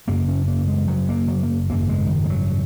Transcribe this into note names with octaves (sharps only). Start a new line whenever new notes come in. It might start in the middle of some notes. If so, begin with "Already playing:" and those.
G#1 F#2 C#3 A#3
C#4
A#3
G#3
F#3
A#3
F#3
A#3
G#1 F#2 C#3 A#3
G#3
D#3
G#3
F#3